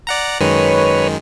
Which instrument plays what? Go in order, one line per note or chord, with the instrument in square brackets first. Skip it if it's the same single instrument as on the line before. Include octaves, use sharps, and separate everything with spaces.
[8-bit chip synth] D5 F#5 A#5
[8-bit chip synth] F#2 D#3 G#3 [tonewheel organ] B4 C#5